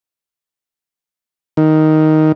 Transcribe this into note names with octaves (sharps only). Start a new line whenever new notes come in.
D#3